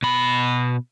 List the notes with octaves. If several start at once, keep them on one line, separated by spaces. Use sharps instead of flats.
B2 B5